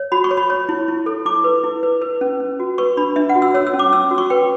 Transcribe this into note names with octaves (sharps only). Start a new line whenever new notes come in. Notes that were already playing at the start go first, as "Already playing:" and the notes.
Already playing: C#5
F#4 B5
C#6
C#5
B5
C#5
E4
E4
A4
E4 D6
B4
E4
B4
B4
C#4
C#4
F#4
B4 C#6
D4 B5
D4 E5
F#5
F#4
E6
C#5 E6
E6
C#4
D6
C#4 E6
F#4
C#6
B4 G5